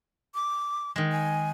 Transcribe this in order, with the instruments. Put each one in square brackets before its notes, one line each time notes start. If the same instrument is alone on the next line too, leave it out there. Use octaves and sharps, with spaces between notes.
[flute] D6
[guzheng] D#3 G#3
[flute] G#5